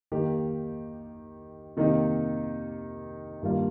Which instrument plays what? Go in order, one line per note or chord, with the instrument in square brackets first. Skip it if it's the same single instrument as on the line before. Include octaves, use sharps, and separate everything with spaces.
[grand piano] D#3 A#3 G4
C3 D#3 A#3 D#4 G4
G2 D#3 G3 A#3 F4